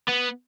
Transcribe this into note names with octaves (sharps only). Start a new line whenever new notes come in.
B3